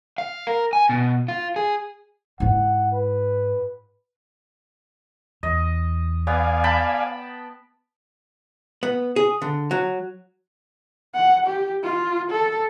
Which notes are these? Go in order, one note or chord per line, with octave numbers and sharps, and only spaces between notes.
F5
A#4
G#5
B2
F4
G#4
G#2 E4 F#5
B4
E2 D#5
B3 D5 F5 G#5
G5 A5 B5
B3
G#4
D3
F#3
F#5
G4
F4
A4